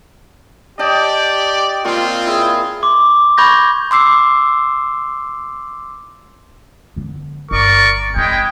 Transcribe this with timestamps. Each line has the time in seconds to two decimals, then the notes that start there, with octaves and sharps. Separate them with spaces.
0.79 G4 D5 D#5 G5 A5
1.85 A#2 C4 F4 C6 C#6
2.26 E4 G#4
2.83 C6 D6
3.38 B5 C#6 G6 G#6 A#6
3.91 C6 D6 E6 C7
6.96 D3 B3
7.51 G1 A#4 D5 C#6
8.16 G#3 C4 E4 G5